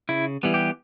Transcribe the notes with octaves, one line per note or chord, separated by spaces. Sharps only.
C#3 E4
E3 G3 B3
G4